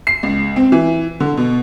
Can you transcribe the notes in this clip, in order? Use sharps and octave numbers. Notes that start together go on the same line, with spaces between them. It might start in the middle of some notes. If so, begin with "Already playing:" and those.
C7
C#2
C4
E3
D3
B2